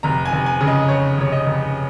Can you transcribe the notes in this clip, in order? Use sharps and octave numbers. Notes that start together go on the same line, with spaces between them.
F1 A#5
G#5
F1
G#5
C#3
D#5
C#3 C#5
F1 C#5
D#5
F1